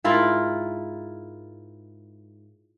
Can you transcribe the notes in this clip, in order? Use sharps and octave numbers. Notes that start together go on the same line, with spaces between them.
G#2 E4 F4 A#4